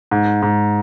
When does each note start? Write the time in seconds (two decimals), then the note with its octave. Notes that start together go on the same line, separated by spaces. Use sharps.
0.11 G#2
0.42 G#2